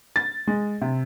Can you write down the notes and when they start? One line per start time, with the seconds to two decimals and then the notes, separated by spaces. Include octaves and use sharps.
0.16 A6
0.47 G#3
0.81 C3